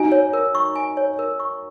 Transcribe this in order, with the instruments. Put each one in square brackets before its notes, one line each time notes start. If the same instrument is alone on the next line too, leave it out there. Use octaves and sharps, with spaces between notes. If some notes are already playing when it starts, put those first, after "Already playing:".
Already playing: [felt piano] D#4 F#4 [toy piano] G#5
[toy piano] C#5
A#4
C#6
G#5
C#5
A#4
C#6